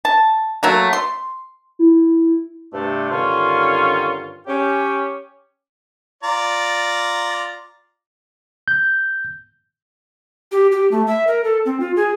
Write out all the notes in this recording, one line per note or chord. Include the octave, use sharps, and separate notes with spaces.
A5
F#3 A3 A#3
C6
E4
G2 C3 A3 D4
G2 D3 D#3 C#4 F4
C#4 G4
F4 D5 A#5
G6
G4
G4
A3
E5
A#4
A4
C4
F4
G#4